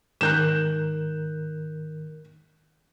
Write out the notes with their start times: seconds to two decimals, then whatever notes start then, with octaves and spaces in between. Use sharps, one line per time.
0.21 G#2 D#3 A#4 F#6 G6 E7